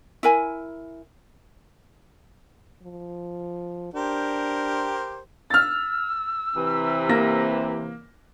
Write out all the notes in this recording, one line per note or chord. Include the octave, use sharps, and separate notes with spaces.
E4 A#4 G#5
F3
D4 G4 A#4 C5
E6 F6 A6
C3 E3
A#3 A#6